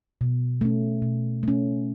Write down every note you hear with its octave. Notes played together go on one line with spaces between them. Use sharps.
B2
A3 C#4
B2
A3 C#4